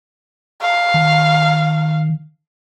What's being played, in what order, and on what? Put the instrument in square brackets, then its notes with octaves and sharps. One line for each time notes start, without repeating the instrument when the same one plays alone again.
[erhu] F5
[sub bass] D#3